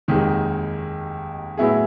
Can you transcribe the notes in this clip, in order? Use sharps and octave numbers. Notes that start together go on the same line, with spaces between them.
F1 D#2 D#3 G#3
A2 F#3 B3 E4 G#4